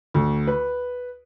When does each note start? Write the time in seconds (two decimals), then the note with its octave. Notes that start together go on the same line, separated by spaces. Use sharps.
0.14 D2
0.47 B4